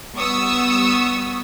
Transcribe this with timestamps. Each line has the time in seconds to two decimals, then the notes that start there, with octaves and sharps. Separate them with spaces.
0.17 G3 B3 C#6 D#6 E6